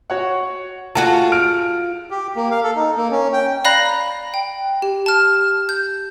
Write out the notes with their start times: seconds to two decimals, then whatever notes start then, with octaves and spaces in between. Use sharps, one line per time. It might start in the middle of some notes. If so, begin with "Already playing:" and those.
0.10 F#4 C#5 F#5
0.95 F4 F#4 G#4 A5
1.32 F6 D7
2.10 G4
2.36 A#3
2.51 F5
2.63 A4
2.76 D#4
2.97 A#3
3.11 C#4
3.33 G5
3.65 D5 F5 A#5 B5 F#6 A#6
4.34 G5
4.82 G4
5.06 A5 F6
5.69 G6